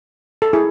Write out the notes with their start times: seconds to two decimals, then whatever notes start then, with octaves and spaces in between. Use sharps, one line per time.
0.42 A4
0.53 E4 G#4